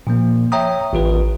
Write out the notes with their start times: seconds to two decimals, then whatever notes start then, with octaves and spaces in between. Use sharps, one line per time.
0.07 A#2 F3 A#3
0.52 C#5 E5 G5 A#5 D#6
0.93 A1 E3 F4 B4